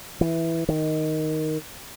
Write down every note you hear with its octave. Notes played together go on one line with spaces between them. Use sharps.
E3
D#3